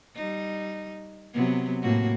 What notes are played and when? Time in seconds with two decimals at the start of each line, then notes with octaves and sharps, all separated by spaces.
0.16 G3 D#4
1.33 C3 F#3 B3
1.82 A2 A#3 F#4